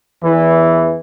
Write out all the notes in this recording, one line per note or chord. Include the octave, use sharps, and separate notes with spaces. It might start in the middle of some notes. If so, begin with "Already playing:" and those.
E2 E3